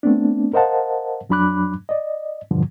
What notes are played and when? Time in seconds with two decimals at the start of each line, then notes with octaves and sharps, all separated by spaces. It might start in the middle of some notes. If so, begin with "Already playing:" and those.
0.03 A3 B3 C4 D4
0.53 A#4 C5 D#5 F5 F#5 A5
1.29 F2 F#3 D4 B5 D6 F#6
1.89 D5 D#5
2.51 E2 G2 B2 D3 F3